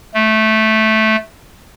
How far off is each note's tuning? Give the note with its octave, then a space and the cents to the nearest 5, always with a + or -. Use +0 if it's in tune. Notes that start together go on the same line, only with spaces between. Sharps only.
A3 -10